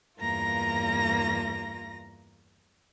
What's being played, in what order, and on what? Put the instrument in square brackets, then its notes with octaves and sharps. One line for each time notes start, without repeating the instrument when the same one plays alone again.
[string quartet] E2 G2 A#3 F4 A#5 A#6